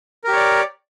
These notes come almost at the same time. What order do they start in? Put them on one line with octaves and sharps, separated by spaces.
A#4 G4 C#5 D5